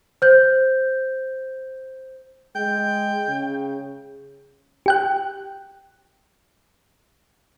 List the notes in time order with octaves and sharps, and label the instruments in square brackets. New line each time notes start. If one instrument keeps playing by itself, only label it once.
[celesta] C5 G6
[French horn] G#3 [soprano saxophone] G5
[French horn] C#3
[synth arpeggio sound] G4 G5 F#6